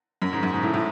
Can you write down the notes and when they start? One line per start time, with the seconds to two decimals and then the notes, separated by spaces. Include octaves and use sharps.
0.22 F#2
0.33 G#2
0.43 F#2
0.53 G#2
0.63 A2
0.74 A2